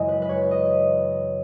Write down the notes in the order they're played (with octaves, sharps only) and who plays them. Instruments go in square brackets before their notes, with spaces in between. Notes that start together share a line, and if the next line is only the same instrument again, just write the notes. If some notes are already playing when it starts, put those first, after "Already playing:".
Already playing: [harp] F#2 C#3 E3 G#3 D#5
B4
B4
C#5
D#5